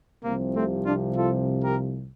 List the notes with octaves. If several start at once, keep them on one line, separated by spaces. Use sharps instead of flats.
C2 C3 F3 A#3
A3 C4
D4 F4
F4 A4
G4 A#4